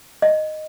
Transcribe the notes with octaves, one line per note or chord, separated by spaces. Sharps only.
D#5